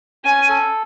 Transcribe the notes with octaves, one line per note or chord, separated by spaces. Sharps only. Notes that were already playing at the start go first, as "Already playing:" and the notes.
C#4 G#5
A4